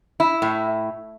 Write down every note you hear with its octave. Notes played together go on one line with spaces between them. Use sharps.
E4
A2